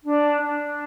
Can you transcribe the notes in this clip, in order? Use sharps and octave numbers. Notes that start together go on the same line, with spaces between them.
D4
D4